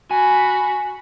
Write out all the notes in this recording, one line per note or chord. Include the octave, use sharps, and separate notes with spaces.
F#4 G#5 B5